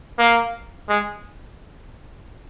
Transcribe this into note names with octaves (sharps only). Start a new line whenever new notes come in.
A#3
G#3